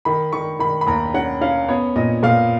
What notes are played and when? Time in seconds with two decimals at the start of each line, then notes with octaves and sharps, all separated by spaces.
0.05 D#3 B5
0.32 D#3 C#6
0.59 D#3 B5
0.81 B5
0.87 D#2 A#5
1.14 C#4 F#5
1.41 C#4 F5
1.68 B3 C#5
1.96 A#2 D#5
2.23 A#2 F5